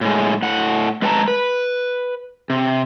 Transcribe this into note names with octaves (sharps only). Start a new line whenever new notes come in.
A2 G#3
A2 F#5
G#3 B4 G5 A5 A#5
B4
C3